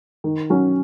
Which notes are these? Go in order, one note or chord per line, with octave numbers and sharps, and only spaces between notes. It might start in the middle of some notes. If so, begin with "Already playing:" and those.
D#3
F#3 C#4